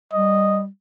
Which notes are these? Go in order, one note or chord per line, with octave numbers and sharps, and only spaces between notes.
G3 D#5